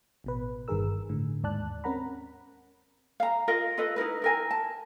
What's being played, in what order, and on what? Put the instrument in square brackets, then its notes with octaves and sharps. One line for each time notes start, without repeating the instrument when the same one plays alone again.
[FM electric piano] A1 B2 B4
G1 G2 D#3 G#4 A#4 E6
A2 D3
D#2 G#2 D5 A5 F#6
C4 C#4 A#4 F#5 A#5 B5
[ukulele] F5 A#5
F4 A#4 D#5 F5
F4 A4 B4 D#5
D#4 E4 A#4 B4
E4 A#4 G#5
A5